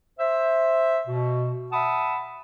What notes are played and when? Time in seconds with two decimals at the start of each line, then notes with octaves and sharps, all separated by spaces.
0.19 C5 E5
1.07 B2
1.72 E5 F#5 A5 B5 D#6